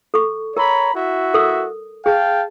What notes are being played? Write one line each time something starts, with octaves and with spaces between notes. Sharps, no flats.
A4 C#6
A#4 C#5 A#5 B5
E4 F#4 E5
A4 A#4 D#6
G#4 F5 G5 A5